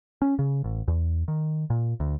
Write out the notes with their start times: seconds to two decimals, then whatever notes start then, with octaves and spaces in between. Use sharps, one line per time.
0.22 C#4
0.39 C#3
0.64 A1
0.88 E2
1.28 D#3
1.70 A#2
2.00 D2